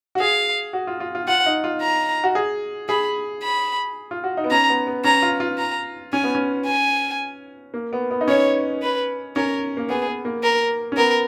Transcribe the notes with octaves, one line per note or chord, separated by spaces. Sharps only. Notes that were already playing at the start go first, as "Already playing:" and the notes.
F#4
G#4 F5
F#4
F4
F4
F4
F4 F#5
D#4
F4
A#5
F#4
G#4
G#4 B5
B5
F4
F#4
D#4
B3
C#4 A#5
B3
B3
C#4 A#5
F4
F4
A#5
C#4 G#5
B3
C#4
G#5
A#3
B3
B3
D#4
C#4 C#5
B4
C#4 A#4
A#3
B3 G#4
B3
A#3
A#4
C#4
B3 A#4